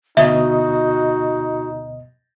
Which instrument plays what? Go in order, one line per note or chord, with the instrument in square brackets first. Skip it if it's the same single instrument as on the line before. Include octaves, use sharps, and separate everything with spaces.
[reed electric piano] D2 B2 D#5 [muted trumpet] D#4 [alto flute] F#4 [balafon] E5